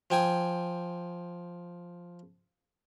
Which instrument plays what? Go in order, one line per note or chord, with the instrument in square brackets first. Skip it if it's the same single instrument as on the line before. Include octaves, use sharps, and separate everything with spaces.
[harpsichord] F3 G5 G#5 D#6